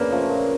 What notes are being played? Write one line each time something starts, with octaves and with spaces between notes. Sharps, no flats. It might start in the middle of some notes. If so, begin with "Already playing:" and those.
Already playing: C#3 A#3 B3 D4
F3 A3 C#4
A#2